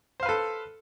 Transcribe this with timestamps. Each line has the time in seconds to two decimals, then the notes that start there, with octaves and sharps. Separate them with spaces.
0.20 C5
0.23 F5
0.26 B4
0.29 A4